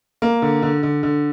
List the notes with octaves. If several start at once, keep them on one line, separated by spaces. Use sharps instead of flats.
A#3
D3
D3
D3
D3